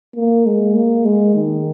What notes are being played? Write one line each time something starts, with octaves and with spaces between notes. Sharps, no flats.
A#3
G#3
A#3
G#3
D#3